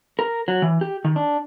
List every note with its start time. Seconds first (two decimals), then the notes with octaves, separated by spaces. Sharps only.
0.19 A#4
0.48 F#3
0.62 E3
0.81 G4
1.05 D#3
1.16 D4